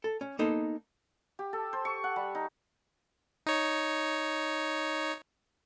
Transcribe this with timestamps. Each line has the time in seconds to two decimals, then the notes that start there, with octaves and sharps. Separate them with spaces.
0.04 A4
0.21 C#4
0.39 A#3 B3 D#4 A4 C5
1.39 G4
1.53 A4
1.73 C5
1.85 C#6
2.04 F#5
2.16 G3
2.35 D#4
3.46 D#4 C#5